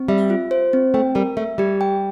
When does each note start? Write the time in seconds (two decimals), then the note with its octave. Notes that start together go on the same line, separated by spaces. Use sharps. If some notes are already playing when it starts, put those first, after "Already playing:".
Already playing: C4
0.08 G3 E5
0.30 F4
0.51 C5
0.73 C4
0.94 A3 G5
1.15 G3 A#4
1.37 A3 E5
1.58 G3 G4
1.81 G5